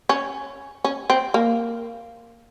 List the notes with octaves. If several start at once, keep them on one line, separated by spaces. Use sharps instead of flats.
C#4
C#4
C4
A#3